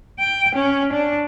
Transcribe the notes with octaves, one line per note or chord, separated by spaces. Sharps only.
G5
C#4
D4